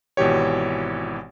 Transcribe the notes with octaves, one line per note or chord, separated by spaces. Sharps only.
G#1 B2 E3 G4 C#5